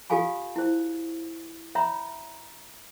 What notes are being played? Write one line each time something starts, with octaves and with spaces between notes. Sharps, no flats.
F4 G4 A4 F5 G#5 B5
E4 C5
C#5 E5 A#5 B5